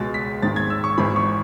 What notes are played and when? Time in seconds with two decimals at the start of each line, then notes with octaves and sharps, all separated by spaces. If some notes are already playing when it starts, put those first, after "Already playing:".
Already playing: C#2 B2 G#3 A6
0.14 B6
0.42 G#1 G#2 D#3 G#3 A6
0.56 G#6
0.70 E6
0.84 C#6
0.98 G#1 G#2 E3 B5
1.16 C#6